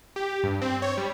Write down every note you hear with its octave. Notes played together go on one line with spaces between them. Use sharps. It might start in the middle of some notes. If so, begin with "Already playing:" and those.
G4
G2
C4
C#5
G3